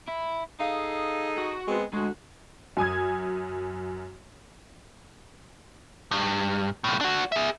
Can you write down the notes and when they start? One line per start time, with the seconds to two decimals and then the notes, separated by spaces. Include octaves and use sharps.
0.08 E4
0.60 D#4 G#4 A4 F5
1.38 F#4
1.68 G#3 B3 C4
1.94 D2 G#3 F#4
2.77 F#2 G#5 D#6 G#6
6.11 G2
6.84 B1 A2
7.01 D4 F#4
7.32 G#4 E5